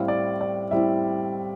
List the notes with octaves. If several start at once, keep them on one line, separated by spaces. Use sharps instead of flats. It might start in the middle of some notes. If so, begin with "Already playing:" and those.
Already playing: A2 G3 C4 E4 F5
D5
D5
A2 G3 C4 E4 E5